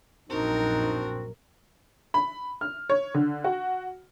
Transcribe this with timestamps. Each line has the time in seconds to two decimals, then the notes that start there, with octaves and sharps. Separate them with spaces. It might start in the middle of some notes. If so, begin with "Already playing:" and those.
0.29 A#1 F#2 C4 D4 D#4 F#4 A#4
2.14 B5
2.61 F6
2.90 C#5
3.14 D3
3.44 F#4